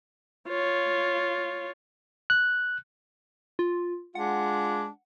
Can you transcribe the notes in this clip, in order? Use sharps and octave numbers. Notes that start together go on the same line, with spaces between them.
F4 C#5
F#6
F4
G#3 D4 F4 F#5